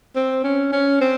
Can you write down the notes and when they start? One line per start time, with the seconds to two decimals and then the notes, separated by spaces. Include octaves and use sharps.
0.15 C4
0.44 C#4
0.72 C#4
1.01 C4